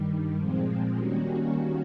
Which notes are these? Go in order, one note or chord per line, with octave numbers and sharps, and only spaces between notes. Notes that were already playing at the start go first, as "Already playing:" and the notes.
Already playing: G2 D#3 G3
A#2 F3 G#3 C4
D#3 G3 A#3 C#4 F#4